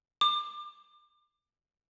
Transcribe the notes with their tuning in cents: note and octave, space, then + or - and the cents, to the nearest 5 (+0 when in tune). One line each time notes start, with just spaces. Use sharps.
D6 +30